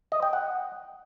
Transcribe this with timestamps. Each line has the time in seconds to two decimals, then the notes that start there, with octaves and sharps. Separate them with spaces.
0.12 D#5
0.22 G5
0.33 F#5